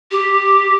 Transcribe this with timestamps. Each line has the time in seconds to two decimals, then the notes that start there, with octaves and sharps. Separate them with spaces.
0.11 G4